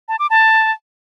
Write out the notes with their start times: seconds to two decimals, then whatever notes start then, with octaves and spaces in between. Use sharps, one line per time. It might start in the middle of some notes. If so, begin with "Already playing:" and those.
0.09 A5
0.19 D6
0.30 A5